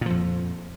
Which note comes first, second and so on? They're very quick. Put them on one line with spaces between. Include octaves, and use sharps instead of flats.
A#2 F3 F2